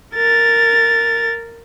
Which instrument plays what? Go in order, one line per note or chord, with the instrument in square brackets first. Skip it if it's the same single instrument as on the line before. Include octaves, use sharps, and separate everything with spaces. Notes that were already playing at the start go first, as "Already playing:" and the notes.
[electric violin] A#4 A6